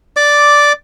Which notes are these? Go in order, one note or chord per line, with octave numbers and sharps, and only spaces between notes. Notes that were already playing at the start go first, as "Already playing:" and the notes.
D5 D6